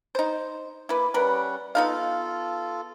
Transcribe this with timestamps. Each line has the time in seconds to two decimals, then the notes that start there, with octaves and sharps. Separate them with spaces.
0.15 D#4 C5
0.89 A#3 E4 B4 D6
1.14 G3 C#4 A#4 B4 F#5
1.75 B3 D#4 F4 A4 F5